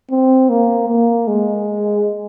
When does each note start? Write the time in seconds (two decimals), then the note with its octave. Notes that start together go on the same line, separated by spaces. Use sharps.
0.11 C4
0.49 A#3
0.89 A#3
1.28 G#3